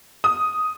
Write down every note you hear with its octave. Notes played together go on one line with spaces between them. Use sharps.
D#6